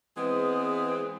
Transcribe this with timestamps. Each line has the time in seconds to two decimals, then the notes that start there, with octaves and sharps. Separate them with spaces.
0.16 E3 G#3 B3 C4 G#4